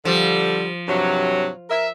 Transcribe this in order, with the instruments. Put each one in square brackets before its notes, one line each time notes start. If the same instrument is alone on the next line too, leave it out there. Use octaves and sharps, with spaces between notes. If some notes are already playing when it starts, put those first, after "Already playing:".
[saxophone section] D3 G3 [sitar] F3
[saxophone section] G2 C3 F#3
A#4 E5